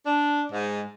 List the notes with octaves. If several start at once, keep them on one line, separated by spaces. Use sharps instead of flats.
D4
G#2